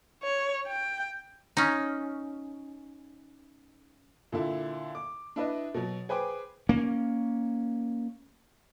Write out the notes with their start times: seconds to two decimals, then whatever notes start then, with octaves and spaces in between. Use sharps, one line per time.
0.23 C#5
0.67 G5
1.57 C#4 D#4
4.32 A#2 D3 E4
4.95 D6
5.36 D4 E4 B4 D#5
5.74 B2 F#3
6.09 G#4 B4 C5 G5 D6
6.69 A#3 C#4